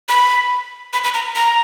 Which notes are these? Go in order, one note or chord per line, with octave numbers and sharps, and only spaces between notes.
B5
B5
B5
A#5
A#5